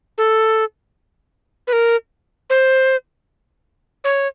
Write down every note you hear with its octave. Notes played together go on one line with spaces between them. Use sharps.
A4
B4
A#4
C5
C#5